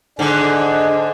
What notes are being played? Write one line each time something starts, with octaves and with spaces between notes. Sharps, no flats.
G#2 D3 D4 G#4